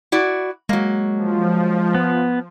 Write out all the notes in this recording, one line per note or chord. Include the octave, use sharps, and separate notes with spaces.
E4 F#4 D5
F#3 G#3 A#3
F3
B3